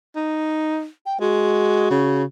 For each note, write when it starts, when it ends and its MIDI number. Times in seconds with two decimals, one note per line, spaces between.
0.15 0.86 63
1.06 1.20 79
1.21 1.89 56
1.21 2.24 66
1.91 2.24 49